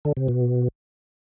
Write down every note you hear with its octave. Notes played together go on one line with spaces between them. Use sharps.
D3
C3
B2